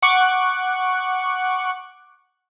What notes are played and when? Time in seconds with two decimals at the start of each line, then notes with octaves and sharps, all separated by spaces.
0.02 F#5 C#6 D6 F#6